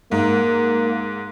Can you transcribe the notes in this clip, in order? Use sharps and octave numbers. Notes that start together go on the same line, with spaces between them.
G#2 A#3